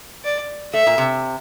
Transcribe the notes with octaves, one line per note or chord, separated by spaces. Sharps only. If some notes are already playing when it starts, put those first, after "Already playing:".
D5
A3 E5
A#2
C3